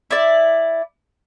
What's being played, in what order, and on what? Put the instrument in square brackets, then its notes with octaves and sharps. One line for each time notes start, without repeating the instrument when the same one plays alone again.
[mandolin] E4 D5